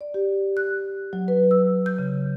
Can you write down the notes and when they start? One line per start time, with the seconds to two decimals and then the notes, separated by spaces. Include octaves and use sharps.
0.01 D5
0.14 G4
0.57 F#6
1.13 F#3
1.28 B4
1.51 E6
1.86 G6
1.99 C#3